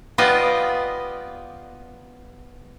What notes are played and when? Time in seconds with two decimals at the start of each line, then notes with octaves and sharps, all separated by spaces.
0.18 B3 F4 G4 D5 D#5 F5